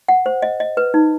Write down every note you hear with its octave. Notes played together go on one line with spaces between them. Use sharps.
F#5
C5
D#5
D#5
B4
D#4